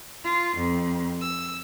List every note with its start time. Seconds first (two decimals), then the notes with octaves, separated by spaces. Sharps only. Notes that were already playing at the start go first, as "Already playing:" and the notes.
0.23 F4
0.57 F2
1.21 E6